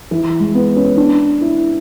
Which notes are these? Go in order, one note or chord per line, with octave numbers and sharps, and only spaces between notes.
E3
G#3
B3
C#4
D4
E4